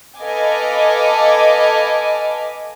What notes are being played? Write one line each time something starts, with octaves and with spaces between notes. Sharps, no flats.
A4 B4 D#5 F5 G#5 D6